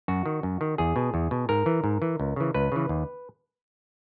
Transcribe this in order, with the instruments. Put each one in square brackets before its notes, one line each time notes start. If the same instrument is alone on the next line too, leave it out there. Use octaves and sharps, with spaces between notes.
[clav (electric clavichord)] F#2 F#4
D#3
F#2
D#3
E2 G#4
B2
E2
B2
G#2 A#4
E3
G#2
E3
C#2
C#3 E3
C#2 B4
C#3 E3
D#2